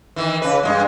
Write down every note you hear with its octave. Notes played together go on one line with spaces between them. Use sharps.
D#3 E3
C#3 B4
G2 A#2 G#3